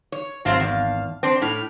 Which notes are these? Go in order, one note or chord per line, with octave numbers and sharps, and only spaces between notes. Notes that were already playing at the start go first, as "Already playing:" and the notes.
C#5
G#1 F#3 C4 E5 F5 A5
E2
C4 D4
A2 B5 F6